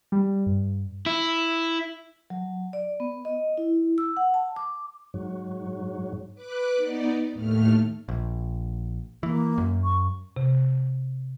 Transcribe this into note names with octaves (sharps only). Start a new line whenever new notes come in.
G3
G2
E4
F#3
D5
B3
D#5
E4
E6
F#5
A5
D6
G#2 F#3
B4 D6 F#6
B3 D#4 D5
D#2 A2 A3 F6
A#1
E3 A#3
F#2
C#6
C3